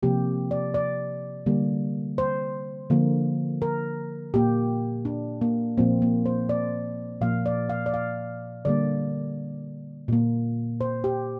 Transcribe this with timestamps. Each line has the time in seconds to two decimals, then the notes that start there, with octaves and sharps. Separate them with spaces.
0.03 C3 F3 A#3 G4
0.51 D5
0.74 D5
1.46 D3 G3 A#3
2.18 C5
2.90 D3 F3 A#3
3.62 A#4
4.34 A#2 A#3 G4
5.05 D4
5.41 A#3
5.77 A#2 F3 A#3 C4
6.02 A#3
6.26 C5
6.49 D5
7.21 A#2 F3 A#3 F5
7.46 D5
7.70 F5
7.86 D5
7.94 F5
8.65 D3 G3 A#3 D5
10.08 A#2 A#3
10.81 C5
11.04 G4